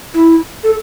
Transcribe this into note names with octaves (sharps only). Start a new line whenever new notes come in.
E4
A4